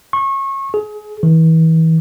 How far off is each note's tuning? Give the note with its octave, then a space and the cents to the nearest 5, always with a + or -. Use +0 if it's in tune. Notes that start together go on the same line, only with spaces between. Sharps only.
C#6 -30
G#4 +30
E3 -35